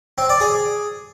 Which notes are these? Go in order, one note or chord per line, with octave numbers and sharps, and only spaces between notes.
C4
D5
G#4